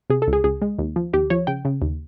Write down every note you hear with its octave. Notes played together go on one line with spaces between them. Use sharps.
C3 G#4
A4
C#2
G#4
C#2 G#4
G#3
D#2
F3
D#2 G4
F3 C#5
C#3 G5
C#3
D#2